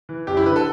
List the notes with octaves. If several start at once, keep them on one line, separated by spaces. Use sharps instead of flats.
E3
F#2 G4
E4
D3 B4
A4